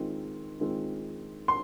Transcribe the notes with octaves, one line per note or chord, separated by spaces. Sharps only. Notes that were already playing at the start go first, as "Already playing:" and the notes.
Already playing: D#3 G#3 C4 F4
D#3 G#3 C4 F4
C6